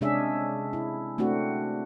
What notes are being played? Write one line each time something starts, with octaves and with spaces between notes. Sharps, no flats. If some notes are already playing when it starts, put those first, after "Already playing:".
C3 G#3 C#4 D4 G#4 E5
E4
A3 C4 D4 F#4